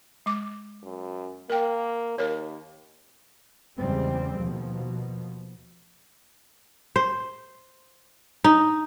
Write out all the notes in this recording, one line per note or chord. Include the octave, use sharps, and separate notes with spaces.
G#3 D6
F#2
A#3 A#4 G5
D#2 A#4 C#5
E2 C#3 G3 G#3 C4
D#2 B2 F3
C5
D#4